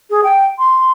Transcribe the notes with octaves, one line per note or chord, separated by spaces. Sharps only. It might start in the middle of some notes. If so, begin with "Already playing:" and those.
G#4
G5
C6